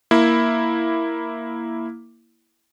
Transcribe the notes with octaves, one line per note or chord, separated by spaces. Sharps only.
A#3 E4